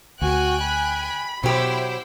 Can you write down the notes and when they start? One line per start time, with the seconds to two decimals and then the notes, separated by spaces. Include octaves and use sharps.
0.21 D2 F#4 G5 G#5 F#6
0.61 B5
1.43 B2 F#3 E4 G4 C5 G5